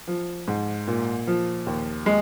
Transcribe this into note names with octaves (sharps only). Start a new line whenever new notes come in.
F3
G#2
A#2
F3
D#2
G#3